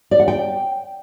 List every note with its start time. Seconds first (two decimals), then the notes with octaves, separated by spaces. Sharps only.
0.11 D5
0.20 F#5
0.28 G5